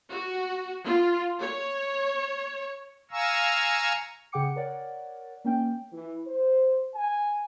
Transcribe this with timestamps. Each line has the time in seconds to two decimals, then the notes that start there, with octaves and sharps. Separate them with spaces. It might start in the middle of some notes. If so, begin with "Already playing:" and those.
0.10 F#4
0.86 F4
1.41 C#5
3.11 F5 G#5 A#5 C#6 E6
4.32 C#3 G#4 F#5 G5 D6 C#7
4.56 A#4 C#5 D5 F#5
5.45 A#3 C#4 G5
5.92 E3
6.26 C5
6.95 G#5